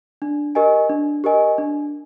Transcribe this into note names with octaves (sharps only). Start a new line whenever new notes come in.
D4
G4 A#4 D#5 G#5
D4
G4 A#4 D#5 G#5
D4